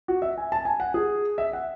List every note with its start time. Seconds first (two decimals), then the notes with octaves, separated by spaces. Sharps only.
0.08 F#4
0.22 E5
0.38 G#5
0.52 A5
0.65 G#5
0.80 F#5
0.94 G#4
1.38 E5
1.53 F#5